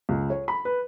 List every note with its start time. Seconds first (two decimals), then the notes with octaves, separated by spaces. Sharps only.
0.09 C#2
0.30 C#5
0.48 B5
0.65 B4